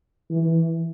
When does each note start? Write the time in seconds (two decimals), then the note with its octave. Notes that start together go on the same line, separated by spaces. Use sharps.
0.31 E3